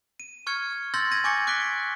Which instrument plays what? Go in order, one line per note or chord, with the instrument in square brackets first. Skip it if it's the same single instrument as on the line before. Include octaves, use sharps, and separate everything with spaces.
[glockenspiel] D#7
C#6 F6 G#6 C#7
C6 E6 G6 A6 A#6 F#7
G#6 A#6 D#7
G#5 C#6 D6 G6 A#6 C#7
D6 F#6 B6 D7 G7